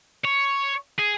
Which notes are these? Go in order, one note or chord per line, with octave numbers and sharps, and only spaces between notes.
C#5
G#4